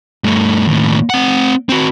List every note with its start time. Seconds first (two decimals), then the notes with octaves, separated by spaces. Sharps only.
0.24 G2 A3
0.68 D#2 A2
1.10 C4 F#5
1.69 C4 F#4